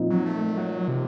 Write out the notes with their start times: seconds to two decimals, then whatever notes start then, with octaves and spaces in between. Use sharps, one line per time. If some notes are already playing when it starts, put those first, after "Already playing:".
Already playing: A#2 F3 C4 D#4
0.10 F#3
0.26 A3
0.58 F#3
0.88 C3